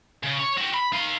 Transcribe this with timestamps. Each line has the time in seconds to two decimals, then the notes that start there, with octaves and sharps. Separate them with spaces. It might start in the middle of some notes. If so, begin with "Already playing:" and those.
0.23 C#3
0.39 C#5
0.57 F#4 G4
0.74 B5
0.93 D#4 F5